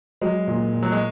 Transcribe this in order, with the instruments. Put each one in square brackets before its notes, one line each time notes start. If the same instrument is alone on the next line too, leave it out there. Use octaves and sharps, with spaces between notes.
[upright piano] F#3 [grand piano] G#3
[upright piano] A#2
A#2
[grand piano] F#3
G#3